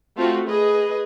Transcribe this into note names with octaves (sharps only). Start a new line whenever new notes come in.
A3 C4 F4 F#4
G#4 B4 D#5